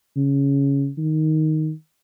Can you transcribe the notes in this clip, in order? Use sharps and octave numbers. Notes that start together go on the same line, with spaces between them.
C#3
D#3